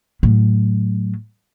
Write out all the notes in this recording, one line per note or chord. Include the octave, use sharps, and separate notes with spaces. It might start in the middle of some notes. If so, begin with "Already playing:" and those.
A2 F#3